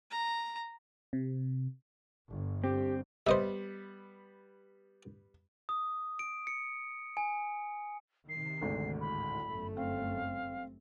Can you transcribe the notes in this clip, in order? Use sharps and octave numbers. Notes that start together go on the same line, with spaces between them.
A#5
C3
G1
C4 G4
G3 B3 C5 D#5 E5
D#6
D7
C#7
G#5
C3 D#3 C7
G#1 D2 G#2
A2 B5
G1 F#2 A3
C4 F5